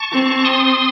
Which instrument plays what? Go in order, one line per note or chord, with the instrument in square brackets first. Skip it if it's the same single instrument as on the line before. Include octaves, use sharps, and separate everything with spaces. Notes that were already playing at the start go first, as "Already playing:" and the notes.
Already playing: [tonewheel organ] A5 C#6
[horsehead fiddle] C4
[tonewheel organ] C6 D#6